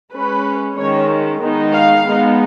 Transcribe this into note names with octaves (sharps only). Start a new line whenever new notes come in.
G#3 C#4 B4
D#3 G#3 C#4 C#5
D#3 G#3 B3 D#4
F5
G#3 B3 D#4